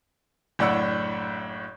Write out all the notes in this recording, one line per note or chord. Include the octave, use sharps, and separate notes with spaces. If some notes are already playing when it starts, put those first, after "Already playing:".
F#1 A2 D4 F#5 E6